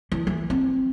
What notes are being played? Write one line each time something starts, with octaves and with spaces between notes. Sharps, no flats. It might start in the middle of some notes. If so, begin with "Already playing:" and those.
E3
E3
C4